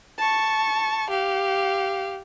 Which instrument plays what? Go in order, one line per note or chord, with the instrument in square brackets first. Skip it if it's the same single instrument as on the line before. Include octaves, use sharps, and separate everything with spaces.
[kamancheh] A5 C#6
G4 F5